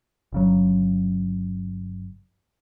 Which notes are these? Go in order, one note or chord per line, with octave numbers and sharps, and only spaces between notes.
G1 C#3 F#3